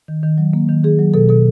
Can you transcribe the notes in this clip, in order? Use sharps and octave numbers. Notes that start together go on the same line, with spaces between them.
D#3
D#3
F#3
A#3
D#3
D#3 G#4
F#3
B2 A4
B2 A4